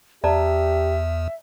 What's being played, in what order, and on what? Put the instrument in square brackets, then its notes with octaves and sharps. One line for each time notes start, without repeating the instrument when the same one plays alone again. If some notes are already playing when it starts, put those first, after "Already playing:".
[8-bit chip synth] E2 [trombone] G4 [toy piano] D5 A5 A#5 [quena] E5